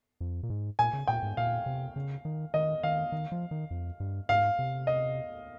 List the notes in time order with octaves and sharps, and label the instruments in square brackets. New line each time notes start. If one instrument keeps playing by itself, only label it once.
[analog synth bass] F2
A#2
G#2
[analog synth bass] A#2 [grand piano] G#5
[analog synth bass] C#3
[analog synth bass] A#2 [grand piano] G5
[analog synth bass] G#2
[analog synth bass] A#2 [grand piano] F5
[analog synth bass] C3
C#3
D#3
[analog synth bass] D#3 [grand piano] D#5
[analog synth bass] D#3 [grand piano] F5
[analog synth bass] D#3
F3
D#3
F2
G2
[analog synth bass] G#2 [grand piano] F5
[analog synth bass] C3
[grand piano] D#5